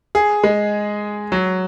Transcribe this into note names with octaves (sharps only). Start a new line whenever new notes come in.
G#4
G#3
F#3